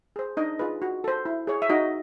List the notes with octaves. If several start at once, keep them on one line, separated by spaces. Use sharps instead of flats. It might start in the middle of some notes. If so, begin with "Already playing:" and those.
G#4 C5
D4 D#4 D#5
F4 G#4 B4
F#4
A4 C5
E4
G#4 C#5
E5
D#4 F#4 D#5